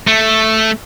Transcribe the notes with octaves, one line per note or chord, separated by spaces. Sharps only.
A3